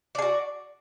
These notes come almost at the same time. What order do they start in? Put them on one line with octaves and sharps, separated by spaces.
D5 G#4 F#4